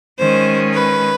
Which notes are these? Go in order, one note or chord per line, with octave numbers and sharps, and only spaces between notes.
D#3 G#3 C#4 C5
B4